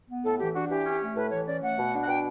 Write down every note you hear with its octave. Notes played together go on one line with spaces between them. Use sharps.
B3
A2 A4
E3 G4
D4 F#4
E3 G4
C#4
A3
A2 B4
E3 C#5
C#4 D5
A3 F#5
B2
D4
F#5
B2 G5